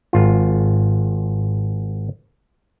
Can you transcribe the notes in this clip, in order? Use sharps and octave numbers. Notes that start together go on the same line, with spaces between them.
G#1 F4